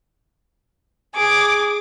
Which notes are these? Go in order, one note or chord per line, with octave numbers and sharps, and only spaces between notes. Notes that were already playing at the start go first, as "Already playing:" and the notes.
G#4 D6